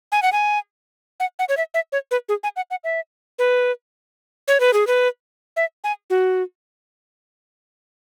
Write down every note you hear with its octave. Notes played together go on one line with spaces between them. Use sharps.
G#5
F#5
G#5
F#5
F#5
C#5
E5
E5
C#5
B4
G#4
G#5
F#5
F#5
E5
B4
C#5
B4
G#4
B4
E5
G#5
F#4